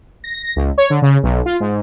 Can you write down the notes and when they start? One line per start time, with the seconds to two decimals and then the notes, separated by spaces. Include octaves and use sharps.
0.24 A#6
0.56 C#2
0.78 C#5
0.90 D3
1.02 C#3
1.23 B1
1.46 F4
1.60 G#2